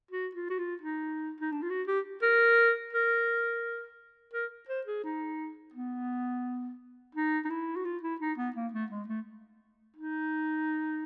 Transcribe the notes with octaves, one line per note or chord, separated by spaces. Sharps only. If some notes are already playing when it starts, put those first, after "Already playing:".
F#4
F4
F#4
F4
D#4
D#4
D4
F4
F#4
G4
A#4
A#4
A#4
C5
G#4
D#4
B3
D#4
D#4
E4
F#4
F4
E4
D#4
B3
A#3
A3
G#3
A3
D#4